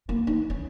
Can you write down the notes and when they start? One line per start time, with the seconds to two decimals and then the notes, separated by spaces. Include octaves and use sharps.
0.09 A#3
0.27 D#4
0.50 C#4